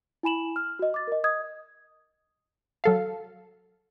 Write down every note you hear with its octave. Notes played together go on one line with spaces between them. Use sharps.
E4 G#5 B5 E7 F#7
F6
F#4 D#5
D6 A6
A#4 D#5
D#5 D#6 G#6
F#3 A4 F5